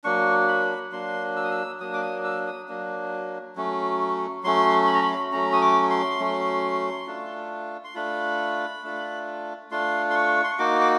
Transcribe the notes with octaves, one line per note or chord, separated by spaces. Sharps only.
F#3 A#3 D4 C#6
B5
F#3 A#3 D4 C6
E6
D#6
E6
F#3 A#3 D4 D#6
D6
D#6
E6
D#6
F#3 A#3 D4
F#3 A3 C#4
F#3 A3 C#4 C6
B5
A#5
B5
F#3 A3 C#4 A#5
D#6
D6
C6
F#3 A3 C#4
A3 D4 F4
C6
A3 D4 F4 B5
A3 D4 F4
A3 D4 F4 C6
C6
C#6
C6
C#6
A#3 D#4 F#4 D6
D6